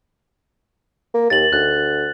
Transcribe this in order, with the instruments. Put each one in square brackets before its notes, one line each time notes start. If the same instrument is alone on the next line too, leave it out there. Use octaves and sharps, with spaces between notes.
[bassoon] A#3
[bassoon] D#2 [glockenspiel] A6 F#7
[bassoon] D2 [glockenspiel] F#6